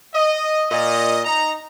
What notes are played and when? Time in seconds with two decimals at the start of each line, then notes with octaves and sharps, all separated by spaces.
0.14 D#5
0.70 A#2 D#5
1.25 D#4 A#5